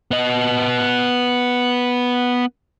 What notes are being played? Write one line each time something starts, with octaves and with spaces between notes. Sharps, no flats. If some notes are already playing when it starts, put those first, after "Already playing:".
B3 D#5